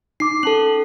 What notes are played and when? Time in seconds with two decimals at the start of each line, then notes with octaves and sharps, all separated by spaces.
0.20 D#4 D6 C7
0.43 C#4 A4 A5 F#7